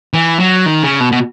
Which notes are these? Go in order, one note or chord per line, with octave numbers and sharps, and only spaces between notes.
E3
F#3
D#3
C#3
B2
B2